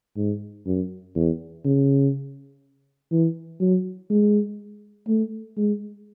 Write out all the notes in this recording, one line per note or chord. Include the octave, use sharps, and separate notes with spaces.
G#2
F#2
E2
C#3
E3
F#3
G#3
A3
G#3